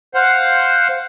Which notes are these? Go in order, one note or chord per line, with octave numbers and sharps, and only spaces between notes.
C5 F5 F#5